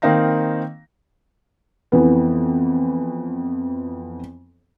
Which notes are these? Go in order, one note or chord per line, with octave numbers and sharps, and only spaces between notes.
D#3 A#3 C4 D#4 F5 A#6
F2 E3 B3